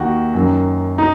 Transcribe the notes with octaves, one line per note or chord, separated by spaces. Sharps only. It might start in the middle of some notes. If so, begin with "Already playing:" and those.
Already playing: D#2 D#3 F#4
F#2 D#3
D#4